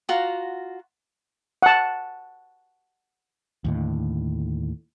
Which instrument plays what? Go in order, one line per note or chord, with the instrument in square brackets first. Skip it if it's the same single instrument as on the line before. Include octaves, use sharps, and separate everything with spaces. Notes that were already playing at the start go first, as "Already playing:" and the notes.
[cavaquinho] F4 F#4 F#5 A#5
[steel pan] F#5 A5
[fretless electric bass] D#2 A2 D3